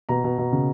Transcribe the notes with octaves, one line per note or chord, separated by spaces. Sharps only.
B2 A#5
B2
B2
C#3